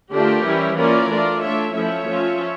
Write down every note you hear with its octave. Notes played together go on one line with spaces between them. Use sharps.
D3 A3 D4 F4 G4 A#4
E3 G3 C#4 E4
E3 A#3 C#4 F4 A#4 D5
A3 D4 F4
A3 D4 F4 C#5 E5
F3 A3 C#4 E4 C#5 E5
F3 C#4 F4